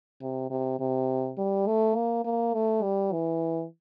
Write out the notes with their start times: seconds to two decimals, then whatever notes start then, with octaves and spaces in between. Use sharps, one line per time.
0.22 C3
0.50 C3
0.80 C3
1.38 G3
1.67 A3
1.96 A#3
2.25 A#3
2.54 A3
2.83 G3
3.12 E3